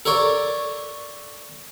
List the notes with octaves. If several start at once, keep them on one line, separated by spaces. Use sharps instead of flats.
A4 A#4 C#5 D5